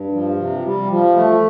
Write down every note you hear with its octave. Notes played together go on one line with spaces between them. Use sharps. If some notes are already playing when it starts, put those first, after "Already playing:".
Already playing: G2
F3
C3
G3
F3
A3